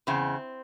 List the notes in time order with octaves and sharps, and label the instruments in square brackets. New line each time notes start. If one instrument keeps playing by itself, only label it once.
[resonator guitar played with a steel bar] E2 C#3 C4